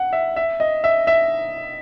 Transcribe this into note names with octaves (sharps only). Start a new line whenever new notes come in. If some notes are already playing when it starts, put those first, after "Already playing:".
Already playing: F#5
E5
E5
D#5
E5
E5